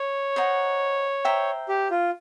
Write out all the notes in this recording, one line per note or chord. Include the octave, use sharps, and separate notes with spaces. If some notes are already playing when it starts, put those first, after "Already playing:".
Already playing: C#5
C5 D#5 F#5 A#5
C5 E5 G5 A#5
G4
F4